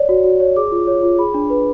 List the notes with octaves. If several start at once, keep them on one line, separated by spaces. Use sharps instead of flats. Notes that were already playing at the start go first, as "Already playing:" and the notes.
Already playing: C#5 D5
F#4
F#4
C#5
G#4 D6
F4
C#5
F4
G#4 B5
D4
B4